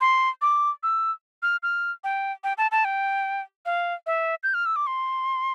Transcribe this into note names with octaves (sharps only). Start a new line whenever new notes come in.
C6
D6
E6
F6
F6
G5
G5
A5
A5
G5
F5
E5
G6
F6
E6
D6
C6